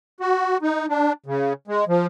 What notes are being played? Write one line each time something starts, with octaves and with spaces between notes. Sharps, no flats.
F#4
D#4
D4
C#3
G#3
F3